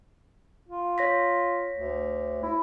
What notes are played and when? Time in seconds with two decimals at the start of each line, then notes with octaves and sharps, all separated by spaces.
0.68 F4
0.98 C#5 A#6 B6
1.72 D2
2.43 E4